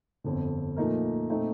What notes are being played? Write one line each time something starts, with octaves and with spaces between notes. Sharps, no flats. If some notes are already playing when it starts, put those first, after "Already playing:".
G1 F2 D3
A#2 F3 A3 D#4 A#4
A#2 A3 C4 D#4